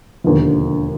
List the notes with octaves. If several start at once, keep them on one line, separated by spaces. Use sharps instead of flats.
E1 D#2 D3 F3